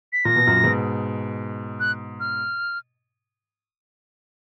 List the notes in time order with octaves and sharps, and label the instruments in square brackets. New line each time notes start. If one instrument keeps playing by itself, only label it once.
[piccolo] B6
[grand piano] A#2 [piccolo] A#6
[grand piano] B2
F#2 A#2
G#2 B2
[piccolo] F#6
F6